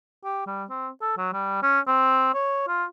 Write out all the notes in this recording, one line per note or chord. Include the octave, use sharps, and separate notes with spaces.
G4
G3
C4
A4
F#3
G3
C#4
C4
C#5
F4